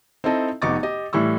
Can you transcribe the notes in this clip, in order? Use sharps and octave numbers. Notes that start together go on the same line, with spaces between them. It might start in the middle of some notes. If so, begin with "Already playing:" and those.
C4 D#4 E4 A4 D#5
F1 B3 D#4 C#6 D6 A6
G4 D#5
A2 E3 G3 C#6 E6